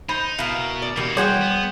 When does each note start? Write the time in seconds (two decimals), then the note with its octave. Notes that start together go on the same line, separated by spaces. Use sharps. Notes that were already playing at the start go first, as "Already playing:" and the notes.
0.09 D#4 C5 B5
0.39 B2 B3 E4 A#4 F5
0.82 D5
0.96 B2 E3 A#3 F#4 G4
1.17 G3 G#4 C5 F#5 G5
1.41 B3